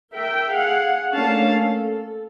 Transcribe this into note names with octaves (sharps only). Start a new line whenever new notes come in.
A#4 E5 G5
G#4 F5 F#5
A3 A#3 C#4 D4 F5 A5
A4